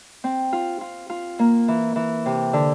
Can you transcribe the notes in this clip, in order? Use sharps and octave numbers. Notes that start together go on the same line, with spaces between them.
C4
F4
F4
F4
A#3
E3
E3
C3
D3